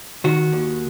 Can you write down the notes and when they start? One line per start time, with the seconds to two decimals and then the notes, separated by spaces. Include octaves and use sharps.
0.24 D#3 F#4
0.52 D#2